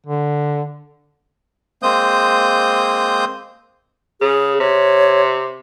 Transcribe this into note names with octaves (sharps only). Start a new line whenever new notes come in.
D3
G#3 A#3 C4 C5 D#6 G6
C#3 G#4
C3 C#5